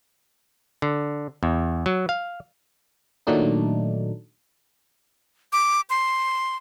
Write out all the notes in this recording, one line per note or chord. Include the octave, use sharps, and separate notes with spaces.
D3
E2
F#3
F5
A#2 D#3 F#3 A3 D4 D#4
D6
C6